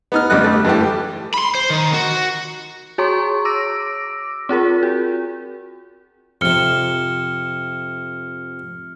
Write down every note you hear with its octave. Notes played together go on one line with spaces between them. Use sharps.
B3 D#4 F6
A1 D3 G3 B3 D#5 F#6
A3
G2 E3 A3 G4
B5 C6
C5
D#3
F#4
F#4 G#4 C#5 A#5 C6 C#6
D6 E6 A#6 D7
C4 F4 G#4 A#4
F#4
F2 C3 F6 C#7 G7